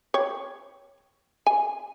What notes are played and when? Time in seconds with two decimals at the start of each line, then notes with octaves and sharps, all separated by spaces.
0.14 C#5 G5
1.47 G#5